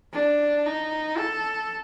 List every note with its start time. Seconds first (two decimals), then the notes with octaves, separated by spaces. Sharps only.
0.13 D4
0.66 D#4
1.18 A4